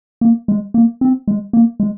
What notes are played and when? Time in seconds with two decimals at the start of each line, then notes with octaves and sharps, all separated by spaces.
0.21 A#3
0.48 G#3
0.74 A#3
1.01 C4
1.28 G#3
1.53 A#3
1.80 G#3